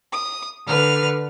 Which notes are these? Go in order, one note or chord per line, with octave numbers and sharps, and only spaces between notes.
D#6
D3 B4 F6